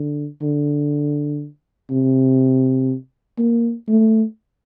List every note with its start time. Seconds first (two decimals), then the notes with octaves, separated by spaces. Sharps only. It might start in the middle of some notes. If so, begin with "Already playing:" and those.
Already playing: D3
0.42 D3
1.90 C3
3.38 A#3
3.88 A3